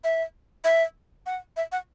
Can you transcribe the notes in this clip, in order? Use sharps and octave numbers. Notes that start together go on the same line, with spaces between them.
E5
E5
F#5
E5
F#5